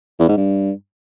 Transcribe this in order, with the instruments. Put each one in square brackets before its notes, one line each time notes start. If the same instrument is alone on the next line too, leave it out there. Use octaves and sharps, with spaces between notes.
[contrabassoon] E2
G#2
G2